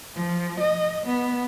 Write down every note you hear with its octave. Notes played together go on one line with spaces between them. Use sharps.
F3
D#5
B3